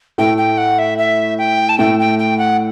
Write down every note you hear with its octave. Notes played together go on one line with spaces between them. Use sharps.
A2 A3 G5
G5
F#5
E5
E5
G5
A5
A2 A3 G5
G5
G5
F#5